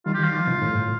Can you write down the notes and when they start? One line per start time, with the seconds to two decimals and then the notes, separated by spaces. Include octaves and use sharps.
0.06 D#3 G3 F4
0.14 G4
0.19 D#3 G3
0.24 F4
0.36 F3
0.47 C3 D#3
0.62 A2
0.69 G2
0.75 A2